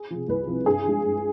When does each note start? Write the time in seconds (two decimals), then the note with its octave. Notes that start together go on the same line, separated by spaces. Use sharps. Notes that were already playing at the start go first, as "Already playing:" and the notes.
Already playing: G#4
0.11 C3 F3
0.28 C2 B4
0.47 C3 F3
0.66 G2 G#4
0.85 F3 G#3
1.04 G2